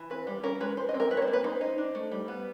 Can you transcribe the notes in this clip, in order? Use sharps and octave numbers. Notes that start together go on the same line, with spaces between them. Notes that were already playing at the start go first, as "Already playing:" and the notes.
Already playing: E3
C4 B4
G3
C#4 A#4
G#3 B4
F3 C5
D#5
C4
A#4
D#3 B4
C#5
C5
A#3
B4
D#4 C5
D#4
D4
A3
G3
B3